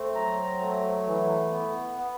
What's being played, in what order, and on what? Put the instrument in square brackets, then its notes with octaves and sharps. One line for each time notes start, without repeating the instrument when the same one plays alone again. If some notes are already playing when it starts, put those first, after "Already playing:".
Already playing: [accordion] A3 C4
F#3 A#5
A3
E3
B3
B3